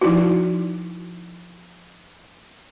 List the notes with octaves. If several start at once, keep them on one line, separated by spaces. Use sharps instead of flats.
F3 D#4 E4 F#4